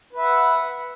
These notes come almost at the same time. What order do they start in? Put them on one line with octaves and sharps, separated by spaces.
B4 E5 F#5